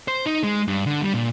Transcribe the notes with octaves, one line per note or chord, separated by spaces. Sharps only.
C5
D#4
G#3
G2
D3
G3
A#2